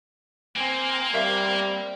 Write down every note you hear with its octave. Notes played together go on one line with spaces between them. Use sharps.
A#3 C4 G#5
G3 C4 A#4 E5 F5